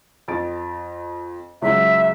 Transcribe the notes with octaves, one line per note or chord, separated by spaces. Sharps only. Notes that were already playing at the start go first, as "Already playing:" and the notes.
F2 A6 D7
C#2 F#3 E5